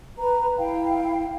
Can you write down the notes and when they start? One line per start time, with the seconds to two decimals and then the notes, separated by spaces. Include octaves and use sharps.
0.18 B4 A#5
0.58 E4 F5 G5